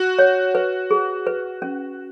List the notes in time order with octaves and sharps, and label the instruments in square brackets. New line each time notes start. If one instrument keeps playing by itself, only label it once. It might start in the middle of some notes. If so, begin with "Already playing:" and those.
Already playing: [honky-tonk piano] F#4
[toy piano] C#5
B4
G#4
B4
C#4